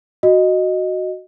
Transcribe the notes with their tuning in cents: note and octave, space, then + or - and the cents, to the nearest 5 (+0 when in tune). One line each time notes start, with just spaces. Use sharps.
F#4 +0 D#5 +0